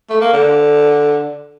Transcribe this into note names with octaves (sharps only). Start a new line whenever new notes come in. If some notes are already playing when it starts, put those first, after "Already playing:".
A3
A#3
D3